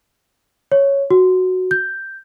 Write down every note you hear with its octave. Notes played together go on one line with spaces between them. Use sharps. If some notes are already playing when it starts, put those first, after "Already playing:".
C#5
F#4
G6